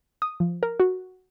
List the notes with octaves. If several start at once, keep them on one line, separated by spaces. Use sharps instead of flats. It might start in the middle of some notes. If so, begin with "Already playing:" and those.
D#6
F3
A#4
F#4